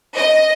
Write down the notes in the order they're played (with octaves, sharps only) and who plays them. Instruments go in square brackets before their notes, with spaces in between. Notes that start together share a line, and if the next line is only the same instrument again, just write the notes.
[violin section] D#5